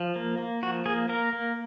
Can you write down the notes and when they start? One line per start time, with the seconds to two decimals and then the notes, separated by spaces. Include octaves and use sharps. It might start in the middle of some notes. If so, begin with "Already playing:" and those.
Already playing: F3
0.16 A#3
0.38 A#3
0.63 F3 F#4
0.86 A#3 G#4
1.09 A#3 A#4
1.33 A#3